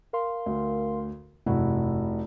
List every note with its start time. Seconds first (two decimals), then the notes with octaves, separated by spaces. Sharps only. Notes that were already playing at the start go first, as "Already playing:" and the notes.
0.13 A#4 F5 C6
0.46 D2
1.46 F1 G2 C3 E4 F#4